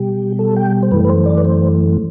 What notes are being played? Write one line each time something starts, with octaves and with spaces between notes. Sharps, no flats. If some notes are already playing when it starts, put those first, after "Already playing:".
Already playing: B2 G3 G4
A4
G5
C5
F#2 E3 A3 B4
B4
C5
D5
B4
C5